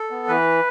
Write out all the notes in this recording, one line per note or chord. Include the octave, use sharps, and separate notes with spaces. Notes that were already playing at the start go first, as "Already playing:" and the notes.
Already playing: A4
B3
E3 B4